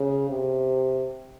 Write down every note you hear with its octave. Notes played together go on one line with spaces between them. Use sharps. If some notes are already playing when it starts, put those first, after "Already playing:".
Already playing: C#3
C3